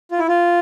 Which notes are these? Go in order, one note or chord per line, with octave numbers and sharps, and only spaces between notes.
F4
E4
F4